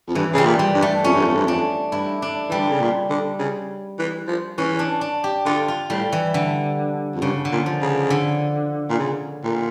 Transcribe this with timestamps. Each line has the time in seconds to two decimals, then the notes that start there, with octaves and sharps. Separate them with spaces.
0.08 F2
0.15 G2 E3
0.34 C#3 G3
0.45 A#2
0.59 G3
0.74 G2
0.82 A3
1.04 F2 C#4
1.14 G2
1.25 F2
1.35 G2
1.46 F2 D4
1.92 G2 E4
2.22 D4
2.49 E3 G3
2.59 D3
2.70 C#3
2.81 A#2
3.10 D3
3.39 C#3
3.98 E3
4.28 F3
4.58 E3 C#4
4.79 D4
5.01 D4
5.24 G4
5.46 D3 F4
5.68 F4
5.90 A2 G3
6.12 E3
6.34 D3
7.15 F2
7.22 G2 C#3
7.45 D3
7.52 A#2
7.66 F3
7.81 C#3
8.10 D3
8.90 A#2
8.98 C#3
9.43 A#2